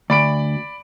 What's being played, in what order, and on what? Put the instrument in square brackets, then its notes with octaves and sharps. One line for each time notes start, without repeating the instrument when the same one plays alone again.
[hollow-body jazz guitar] D2 [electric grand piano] D5 B5 D7